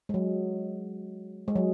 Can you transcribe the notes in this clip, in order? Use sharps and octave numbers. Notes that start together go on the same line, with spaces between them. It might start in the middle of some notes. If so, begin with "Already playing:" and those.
G#3
F#3
G#3
F#3